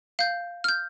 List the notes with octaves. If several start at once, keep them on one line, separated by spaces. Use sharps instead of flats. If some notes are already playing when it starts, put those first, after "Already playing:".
F5 G6
F6 G6